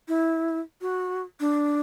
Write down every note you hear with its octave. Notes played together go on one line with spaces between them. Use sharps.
E4
F#4
D4